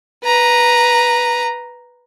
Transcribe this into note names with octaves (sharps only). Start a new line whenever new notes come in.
B4 A#5